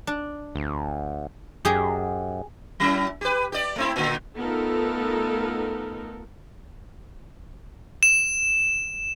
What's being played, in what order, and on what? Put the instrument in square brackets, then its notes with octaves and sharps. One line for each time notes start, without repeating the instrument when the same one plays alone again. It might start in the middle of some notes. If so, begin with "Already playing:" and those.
[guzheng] D4
[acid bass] D2
[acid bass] F#2 [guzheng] G4 G#4 D#5
[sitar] F#3 C#4 E4
G4 B4
G4 D5
A3 C4 E4
A2 D3
[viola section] A3 B3 D#4 F4 A4 A#4
[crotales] E7